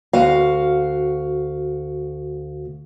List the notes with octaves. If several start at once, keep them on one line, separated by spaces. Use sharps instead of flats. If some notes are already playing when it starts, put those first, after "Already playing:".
D2 F#4 F5